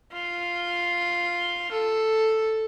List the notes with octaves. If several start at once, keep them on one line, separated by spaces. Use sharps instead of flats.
F4
A4